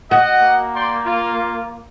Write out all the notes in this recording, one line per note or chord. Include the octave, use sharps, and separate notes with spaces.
F#4 D#5 F#5
A#3
D5 G5 C6
F4